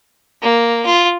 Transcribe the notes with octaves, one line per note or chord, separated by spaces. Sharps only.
A#3
F4